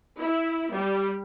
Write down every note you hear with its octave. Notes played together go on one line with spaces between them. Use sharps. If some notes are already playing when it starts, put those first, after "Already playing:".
E4
G3